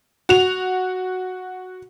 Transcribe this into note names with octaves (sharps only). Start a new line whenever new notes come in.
F#4 F7